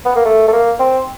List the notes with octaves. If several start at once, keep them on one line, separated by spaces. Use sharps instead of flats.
B3
A#3
A3
A3
A#3
C4